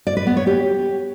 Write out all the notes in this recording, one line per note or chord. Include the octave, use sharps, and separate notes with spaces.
D5
B4
B3
C#5
G4